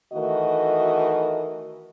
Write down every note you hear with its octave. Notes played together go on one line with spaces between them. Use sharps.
D#3 E3 A3 F#4 A#4 D#5